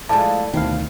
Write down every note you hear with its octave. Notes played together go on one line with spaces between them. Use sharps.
F3 G#3 E4 A4 D5 A5
D2 B2 D#3 C4 E4 F5